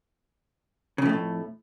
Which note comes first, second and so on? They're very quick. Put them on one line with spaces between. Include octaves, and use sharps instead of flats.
C#3 F2 A3 A2